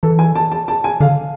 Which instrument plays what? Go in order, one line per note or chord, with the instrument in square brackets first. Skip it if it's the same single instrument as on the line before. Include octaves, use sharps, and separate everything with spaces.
[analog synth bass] E3 [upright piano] A4
[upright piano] G#5
A5
A5
A5
G#5
[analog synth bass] D3 [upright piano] F5